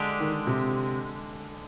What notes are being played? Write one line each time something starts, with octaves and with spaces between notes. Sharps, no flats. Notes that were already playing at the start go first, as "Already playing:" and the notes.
Already playing: D3 G#3 D4 G4
D#3
C3